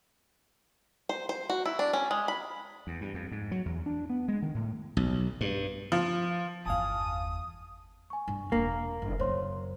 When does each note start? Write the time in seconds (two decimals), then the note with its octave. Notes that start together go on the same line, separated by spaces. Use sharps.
1.09 C5
1.29 C5
1.50 F#4
1.66 E4
1.79 D4
1.93 C#4
2.11 G#3
2.28 B5
2.87 E2
3.01 G2
3.14 F2
3.32 G#2
3.52 F#3
3.66 E2
3.86 D4
4.10 B3
4.28 G#3
4.42 D#3
4.55 A2
4.97 B1
5.41 G2
5.92 F3
6.66 G1 E2 F5 G#5 A5 D#6
8.10 G#5 C#6
8.28 G2
8.52 E1 A#3 D4
9.02 F#1
9.19 F#2 C#3 C5 C#5 C6